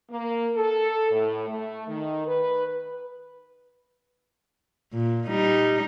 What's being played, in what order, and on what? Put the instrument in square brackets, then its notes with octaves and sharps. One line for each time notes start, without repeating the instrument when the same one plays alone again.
[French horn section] A#3
A4
A2
A3
D#3
B4
[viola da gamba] A#2
G3 D#4